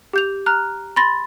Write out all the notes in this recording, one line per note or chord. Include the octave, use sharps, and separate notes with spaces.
G4 G6 F7
A#5 F6 F#6
B5 C6 A6 A#6